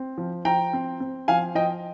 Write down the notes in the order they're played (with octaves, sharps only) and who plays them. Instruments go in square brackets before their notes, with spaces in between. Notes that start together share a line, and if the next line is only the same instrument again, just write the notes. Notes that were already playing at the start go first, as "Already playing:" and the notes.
Already playing: [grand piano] C4
F3
F3 G5 A#5
C4
C4
F3 F5 G#5
F3 D#5 G5